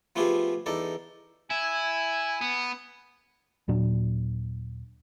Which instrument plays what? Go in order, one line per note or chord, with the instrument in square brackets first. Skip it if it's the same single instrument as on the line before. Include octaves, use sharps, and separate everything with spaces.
[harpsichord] F3 A3 B3 F4 G4 G#4
E2 D#4 A4 D5
[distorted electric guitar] E4 [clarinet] G#5
[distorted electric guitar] B3
[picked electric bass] D#2 A#2 F#3 D4